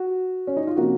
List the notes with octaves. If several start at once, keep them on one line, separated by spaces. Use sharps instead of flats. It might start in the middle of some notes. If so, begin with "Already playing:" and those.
Already playing: F#4
C#4
D#4
F4
C3 F3 A#3 C#4 F#4